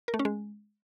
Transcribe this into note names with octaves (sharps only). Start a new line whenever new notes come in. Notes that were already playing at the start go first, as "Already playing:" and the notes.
A#4
A3
C#4
G#3